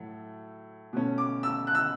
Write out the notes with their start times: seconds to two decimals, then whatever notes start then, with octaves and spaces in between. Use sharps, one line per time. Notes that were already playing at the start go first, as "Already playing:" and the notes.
Already playing: A2 F#3 A3
0.93 B2 A3 C#4
1.18 D6
1.43 E6
1.67 F#6
1.75 E6